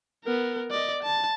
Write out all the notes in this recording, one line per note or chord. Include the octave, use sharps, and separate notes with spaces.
B3 A#4
D5 D#5
A5